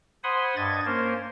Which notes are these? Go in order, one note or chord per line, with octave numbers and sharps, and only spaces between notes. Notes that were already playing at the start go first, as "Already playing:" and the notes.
C5 F#5 G#5 B5 C6 D#6
G2 D#5 G#6 A6
A#3 C#4 A#4 C5